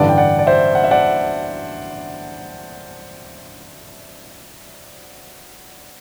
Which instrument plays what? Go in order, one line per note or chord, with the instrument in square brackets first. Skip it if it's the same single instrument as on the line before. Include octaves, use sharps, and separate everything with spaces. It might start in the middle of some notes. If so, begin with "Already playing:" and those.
Already playing: [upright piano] A1 G2 D3 [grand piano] D5 F#5
[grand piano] G5
D5 F#5
D5
C5 E5
F#5
E5
D5 F#5